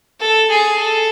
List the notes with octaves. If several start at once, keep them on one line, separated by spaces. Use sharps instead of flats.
A4
G#4
A4